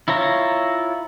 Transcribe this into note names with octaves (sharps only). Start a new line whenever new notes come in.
E4 F4 C#5 A#5